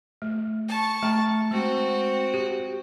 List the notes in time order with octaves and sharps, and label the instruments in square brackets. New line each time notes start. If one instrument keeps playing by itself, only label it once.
[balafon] A3
[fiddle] A5 C#6
[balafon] A3 G5 A#5
[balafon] G#3 [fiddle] C4 F#4
[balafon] G4